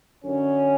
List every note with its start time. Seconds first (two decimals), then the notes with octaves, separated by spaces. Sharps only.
0.24 F#2 D3 C#4